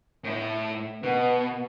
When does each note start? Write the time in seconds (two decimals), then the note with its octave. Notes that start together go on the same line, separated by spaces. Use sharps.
0.24 A2 E4
1.03 B2 B3